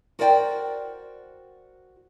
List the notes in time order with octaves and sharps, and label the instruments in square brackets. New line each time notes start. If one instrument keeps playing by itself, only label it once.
[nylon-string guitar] F#4 A#4 C5 D5 E5 G5